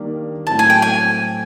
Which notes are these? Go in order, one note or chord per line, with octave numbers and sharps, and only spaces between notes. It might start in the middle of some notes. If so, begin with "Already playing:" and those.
Already playing: D#3 G3 A#3 D4
A2 F#3 A3 C4 E4 A5
G#5
G5
G#5